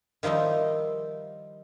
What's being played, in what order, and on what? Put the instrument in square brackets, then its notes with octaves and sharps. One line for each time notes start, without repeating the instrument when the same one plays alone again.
[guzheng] D#3 F3 G3 D#4 E4